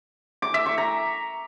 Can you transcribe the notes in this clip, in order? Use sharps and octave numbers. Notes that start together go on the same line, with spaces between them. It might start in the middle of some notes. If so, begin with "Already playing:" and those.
D6
E5
C#6
A#5